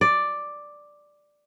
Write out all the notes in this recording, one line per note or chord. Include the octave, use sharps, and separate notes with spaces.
D5